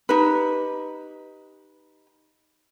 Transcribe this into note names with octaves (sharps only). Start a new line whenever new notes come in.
D#4 G4 B4